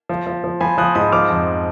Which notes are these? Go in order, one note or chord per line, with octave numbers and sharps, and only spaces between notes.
F3
F3
F3
F3 G#5 B5
F3 D#6 F#6
G#2 B5 D#6
F3 D6 F6
F2